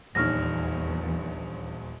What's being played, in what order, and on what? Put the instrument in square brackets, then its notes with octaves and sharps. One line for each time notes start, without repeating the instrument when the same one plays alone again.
[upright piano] D#1 A#1 C#5 [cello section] E2 [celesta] D#4 F6 A#6